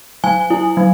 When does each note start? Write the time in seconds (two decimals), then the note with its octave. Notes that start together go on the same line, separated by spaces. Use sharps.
0.24 F#3 G#5
0.50 E4
0.77 F#3